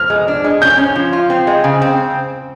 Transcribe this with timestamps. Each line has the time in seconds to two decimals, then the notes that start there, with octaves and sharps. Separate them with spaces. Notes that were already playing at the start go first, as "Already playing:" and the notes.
Already playing: F6
0.10 G#3
0.28 D4
0.44 G#3
0.61 C#4 G6
0.78 C#4
0.96 F3
1.13 F4
1.30 C4
1.47 G#3
1.64 C#3
1.82 C4